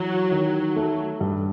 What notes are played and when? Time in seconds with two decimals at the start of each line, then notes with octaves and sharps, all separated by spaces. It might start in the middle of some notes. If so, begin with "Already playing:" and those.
Already playing: E3 F#3
0.31 D#3
0.76 A3
1.21 G2